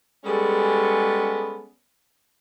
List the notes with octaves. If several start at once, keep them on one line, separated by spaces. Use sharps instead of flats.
G3 G#3 B3 C#4 G#4 A4